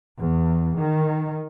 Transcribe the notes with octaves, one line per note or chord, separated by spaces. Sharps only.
E2
D#3